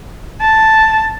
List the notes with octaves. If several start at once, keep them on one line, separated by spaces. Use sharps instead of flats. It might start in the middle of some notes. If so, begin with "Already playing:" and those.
A5